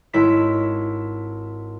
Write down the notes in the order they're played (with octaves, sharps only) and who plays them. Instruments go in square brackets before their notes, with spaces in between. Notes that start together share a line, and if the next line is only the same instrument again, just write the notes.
[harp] G#1 E4 C#5 B6 E7